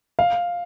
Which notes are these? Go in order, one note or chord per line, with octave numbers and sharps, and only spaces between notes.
F5